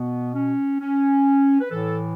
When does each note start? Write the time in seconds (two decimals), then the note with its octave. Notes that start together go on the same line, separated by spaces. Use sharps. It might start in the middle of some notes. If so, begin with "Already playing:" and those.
Already playing: B2 B3
0.35 C#4
0.80 C#4
1.61 B4
1.71 A2 E3 A4